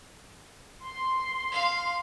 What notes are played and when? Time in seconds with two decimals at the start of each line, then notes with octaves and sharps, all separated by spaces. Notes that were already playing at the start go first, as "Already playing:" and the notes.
0.84 C6
1.52 F5